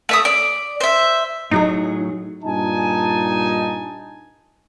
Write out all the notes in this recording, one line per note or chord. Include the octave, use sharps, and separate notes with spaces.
A3 E5 D#6
D5
C5 E5
A2 F#3 D#4 G#4
G2 A#2 D#4 G#5 A5